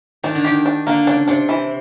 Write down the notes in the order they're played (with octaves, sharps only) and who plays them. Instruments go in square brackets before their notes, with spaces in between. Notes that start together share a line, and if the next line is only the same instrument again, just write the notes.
[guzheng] D#3 [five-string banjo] D4
[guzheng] D3
[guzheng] D#3 [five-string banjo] G4
[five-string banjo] D4
[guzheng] D3 [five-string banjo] A#3
[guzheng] C#3 [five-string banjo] D4
[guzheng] C3 [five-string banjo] D4
[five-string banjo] E3